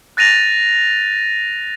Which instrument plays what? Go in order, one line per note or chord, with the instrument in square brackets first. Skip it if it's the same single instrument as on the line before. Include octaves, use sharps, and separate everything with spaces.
[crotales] F#6 A6 A#6 D#7 F7